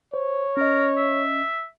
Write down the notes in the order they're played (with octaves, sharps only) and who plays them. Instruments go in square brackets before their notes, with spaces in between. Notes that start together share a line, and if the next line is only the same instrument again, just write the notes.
[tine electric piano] C5 [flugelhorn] C#5
[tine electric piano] C#4 D#5 [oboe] A#4
[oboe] E5